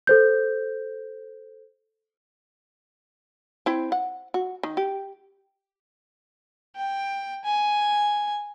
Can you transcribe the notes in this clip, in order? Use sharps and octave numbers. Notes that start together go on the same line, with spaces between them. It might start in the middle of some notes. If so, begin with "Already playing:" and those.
A4 C5 G6
C4 E4
F#5
F#4
D#3
G4
G5
G#5